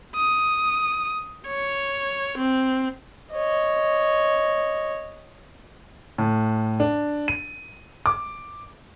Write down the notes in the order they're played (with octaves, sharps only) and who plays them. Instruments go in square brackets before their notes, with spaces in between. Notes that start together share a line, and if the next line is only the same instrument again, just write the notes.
[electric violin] D#6
C#5
C4
[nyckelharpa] C#5 D#5
[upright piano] A2
D4
D#7
D6